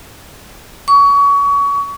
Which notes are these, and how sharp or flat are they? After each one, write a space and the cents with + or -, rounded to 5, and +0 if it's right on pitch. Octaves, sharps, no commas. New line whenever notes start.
C#6 +30